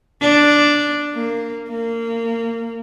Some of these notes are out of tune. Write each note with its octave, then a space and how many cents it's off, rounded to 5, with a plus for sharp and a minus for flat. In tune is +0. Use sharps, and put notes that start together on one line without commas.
D4 +0
A#3 -15
A#3 -25